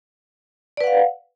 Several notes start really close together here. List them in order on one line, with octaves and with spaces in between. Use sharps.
D5 B4 F#5 F5